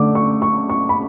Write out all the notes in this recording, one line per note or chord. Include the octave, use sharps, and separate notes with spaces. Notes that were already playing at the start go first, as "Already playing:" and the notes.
Already playing: D3 A3 D6
C#6
C#6
C#6
B5